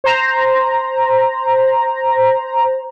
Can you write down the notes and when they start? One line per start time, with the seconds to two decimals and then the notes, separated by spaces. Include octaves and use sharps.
0.04 C5 A#5